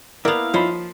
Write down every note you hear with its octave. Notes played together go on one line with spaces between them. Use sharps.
A#3 B3 E4 A#4 D5 F5 F#5
F3 D#4 C5 C#5 D#5 B5